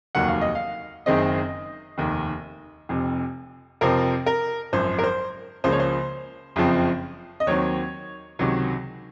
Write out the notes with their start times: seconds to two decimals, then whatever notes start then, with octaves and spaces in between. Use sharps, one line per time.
0.15 F1 D#2 D#3 F#3 A#3 F#5
0.28 F5
0.41 D#5
0.55 F5
1.06 F#1 F#2 D#3 G#3 C4 D#5
1.98 F1 D#2 D#3
2.89 F1 F2 C3
3.81 F2 C3 F3 C4 A#4
4.26 A#4
4.73 G#1 F#2 F3 C5
4.99 A#4
5.04 C5
5.64 C#2 C#3 F3 A#3 C5
5.72 C#5
5.80 C5
6.56 F#1 F2 C#3 F3 C4
7.40 D#5
7.47 D#2 D#3 F#3 C4 C#5
8.39 C#2 C3 D#3 F#3